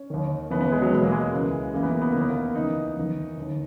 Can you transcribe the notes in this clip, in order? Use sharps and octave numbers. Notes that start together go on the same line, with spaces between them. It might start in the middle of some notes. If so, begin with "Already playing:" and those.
Already playing: C#4
D#2 D#3
D#2 C#3 E3 B3
B3
G#3
F#3
E2 B2 G#3
A#3
G#3
C#2 C#3 E3
F#2 C#3 E3 A#3
B3
A#3
B3
D#2 D#3 A#3
B3
A#3
C#2 C#3 E3 D#4
E2 D#3
D#2 D#3